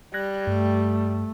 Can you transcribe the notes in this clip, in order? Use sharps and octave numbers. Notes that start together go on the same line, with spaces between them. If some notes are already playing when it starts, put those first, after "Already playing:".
G3 F#6 G#6 A#6
G2 A3